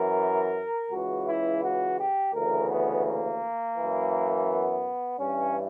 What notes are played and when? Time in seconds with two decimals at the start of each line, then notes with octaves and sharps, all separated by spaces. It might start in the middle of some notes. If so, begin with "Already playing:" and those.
Already playing: F#2 E3 A#4
0.91 C#2 C#3 E3 F#4
1.27 E4
1.63 F#4
1.99 G4
2.34 D2 C#3 E3 A#4
2.69 B3
3.06 A#3
3.77 E3
3.82 F#2
4.48 B3
5.19 G2 E3 C#4